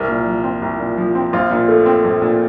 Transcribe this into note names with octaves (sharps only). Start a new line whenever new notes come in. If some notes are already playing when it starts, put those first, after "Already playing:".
Already playing: C2 A#4
A#2
F3
C4
C2
A#2
F3
C4
A#1 F4
A#2
A3
C4
A#1
A#2